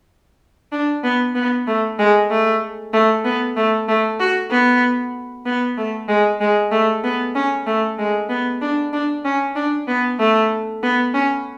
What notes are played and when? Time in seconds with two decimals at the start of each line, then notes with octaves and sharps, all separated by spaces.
0.72 D4
1.04 B3
1.35 B3
1.67 A3
1.99 G#3
2.30 A3
2.93 A3
3.25 B3
3.57 A3
3.88 A3
4.20 F#4
4.51 B3
5.46 B3
5.78 A3
6.09 G#3
6.41 G#3
6.72 A3
7.04 B3
7.35 C#4
7.67 A3
7.99 G#3
8.30 B3
8.62 D4
8.93 D4
9.25 C#4
9.56 D4
9.88 B3
10.19 A3
10.83 B3
11.14 C#4